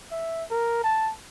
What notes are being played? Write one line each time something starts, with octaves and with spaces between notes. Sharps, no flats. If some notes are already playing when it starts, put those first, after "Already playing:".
E5
A#4
A5